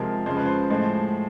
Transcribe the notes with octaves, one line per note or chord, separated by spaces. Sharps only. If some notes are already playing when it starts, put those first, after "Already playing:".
Already playing: C3 F3 G#3 A#4
C#3 F3 G#3 C5
B4
C5
A2 F3 G#3